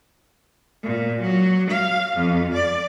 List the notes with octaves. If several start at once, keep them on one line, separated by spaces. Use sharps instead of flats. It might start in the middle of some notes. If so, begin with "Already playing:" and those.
A#2
F#3
F5
F2
D5